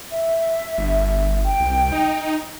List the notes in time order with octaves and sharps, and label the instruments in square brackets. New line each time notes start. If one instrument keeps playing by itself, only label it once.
[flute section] E5
[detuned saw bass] G1
[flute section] G5
[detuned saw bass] C2
D#4